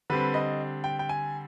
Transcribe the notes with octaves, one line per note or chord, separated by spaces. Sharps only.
D3 G3 C4 B4
D#5
G5
G5
G#5